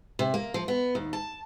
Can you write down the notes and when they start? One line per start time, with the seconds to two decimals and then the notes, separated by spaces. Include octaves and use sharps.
0.19 C3
0.34 A#3
0.54 F3
0.68 B3
0.95 D#2
1.13 A5